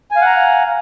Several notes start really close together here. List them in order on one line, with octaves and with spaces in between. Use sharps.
G#5 F5 F#5 A#5